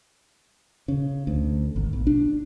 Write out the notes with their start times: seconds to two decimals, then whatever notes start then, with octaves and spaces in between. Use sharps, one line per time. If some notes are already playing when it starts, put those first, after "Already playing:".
0.88 C#3
1.27 D2
1.76 G#1
1.93 B1
2.07 D4